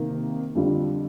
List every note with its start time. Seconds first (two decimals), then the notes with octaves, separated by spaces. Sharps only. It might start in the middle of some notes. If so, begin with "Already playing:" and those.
Already playing: C3 D#3 A#3
0.55 F2 D3 G3 D4 F4